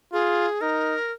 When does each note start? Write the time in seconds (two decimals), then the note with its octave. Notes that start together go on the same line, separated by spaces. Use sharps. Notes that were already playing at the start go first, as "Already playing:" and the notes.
0.13 F4 G#4
0.61 D#4 A#4